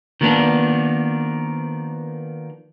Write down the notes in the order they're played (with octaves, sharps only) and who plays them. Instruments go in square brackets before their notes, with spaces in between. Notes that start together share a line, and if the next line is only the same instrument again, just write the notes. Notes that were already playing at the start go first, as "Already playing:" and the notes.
[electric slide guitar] D#3 F3 A#3 B3 D4